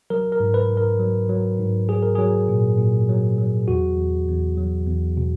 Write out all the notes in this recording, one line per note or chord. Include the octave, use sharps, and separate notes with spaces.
F#3 A#4
A#4
G#2
B4
G#2
A#4
F#3
F#3
G#2
F#3 G#4
A#4
F#3 G#4
A#2
A#2
F#3
F#3
E2 F#4
E2
E2
F#3
E2
B2